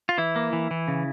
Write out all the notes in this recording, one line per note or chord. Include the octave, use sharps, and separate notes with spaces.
F4
E3 E4
A#3
E3
E3
C#3